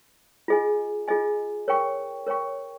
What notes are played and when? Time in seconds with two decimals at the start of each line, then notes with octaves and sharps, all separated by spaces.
0.48 F4 G#4 D#5 G#5
1.08 F4 G#4 D#5 G#5
1.68 A#4 C#5 G5 C#6
2.26 A#4 C#5 G5 C#6